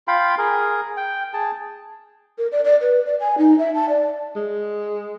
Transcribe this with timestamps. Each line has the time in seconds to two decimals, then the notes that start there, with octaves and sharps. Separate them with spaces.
0.08 F4 F5 G5 B5
0.38 G#4 A#4
0.97 G5
1.34 G#4 A5
2.38 A#4
2.52 D5
2.65 D5
2.81 B4
3.06 D5
3.20 G#5
3.38 D#4
3.59 E5
3.74 A5
3.89 D5
4.36 G#3